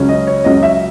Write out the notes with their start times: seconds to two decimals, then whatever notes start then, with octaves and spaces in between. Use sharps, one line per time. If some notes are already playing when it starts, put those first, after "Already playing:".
Already playing: C#2 C#3 F#3 C#4
0.09 D#5
0.27 C#5
0.44 C#2 C#3 F#3 C#4 D#5
0.63 E5